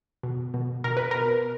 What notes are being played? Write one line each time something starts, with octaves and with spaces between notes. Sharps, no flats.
B2
B2
B2 A#4
B4
B2 A#4